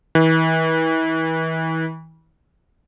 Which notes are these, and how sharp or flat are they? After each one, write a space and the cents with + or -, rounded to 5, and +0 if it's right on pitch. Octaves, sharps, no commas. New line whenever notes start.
E3 -35